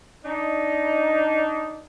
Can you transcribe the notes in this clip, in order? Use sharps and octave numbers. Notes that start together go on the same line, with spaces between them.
D4 D#4